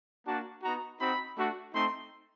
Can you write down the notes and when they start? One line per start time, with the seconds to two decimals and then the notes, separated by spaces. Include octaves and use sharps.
0.27 A#3 D4 F#4 A5
0.63 B3 D#4 F#4 A#5
1.00 C4 D#4 F#4 B5
1.37 A3 D4 F#4
1.74 A3 C4 D#4 C6